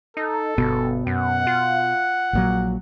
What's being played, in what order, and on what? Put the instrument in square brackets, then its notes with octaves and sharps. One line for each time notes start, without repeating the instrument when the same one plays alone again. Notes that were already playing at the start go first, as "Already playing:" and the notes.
[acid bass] D#4 [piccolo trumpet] A4
[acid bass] G1 [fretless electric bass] B2
[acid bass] F#2 [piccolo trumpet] F#5
[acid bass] F4
[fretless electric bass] A#1 A#2 F#3